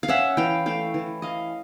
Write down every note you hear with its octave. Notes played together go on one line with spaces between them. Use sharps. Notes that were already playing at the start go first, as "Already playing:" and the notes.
F5
C#4 E5 F#5
E3 F5 G5
A3 F5 G5
E3
C#4 D#5 F5